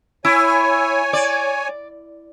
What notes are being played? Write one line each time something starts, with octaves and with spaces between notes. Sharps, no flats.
E4 C#5 G#5
D5